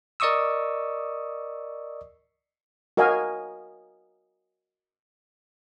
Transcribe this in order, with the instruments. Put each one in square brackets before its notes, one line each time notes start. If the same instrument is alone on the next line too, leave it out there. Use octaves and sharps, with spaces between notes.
[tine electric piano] A#4 D5 D#5 C#6 D#6 E6
[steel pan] F#4 A#4 D#5 F5 G#5